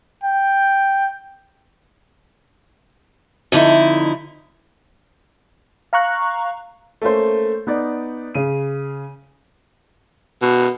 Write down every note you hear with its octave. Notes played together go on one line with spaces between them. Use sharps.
G5
F2 D3 D#4 E4
F5 A#5 C#6 F#6
A3 A#3 C#4 C5
B3 D#4 D5
C#3 D#7
B2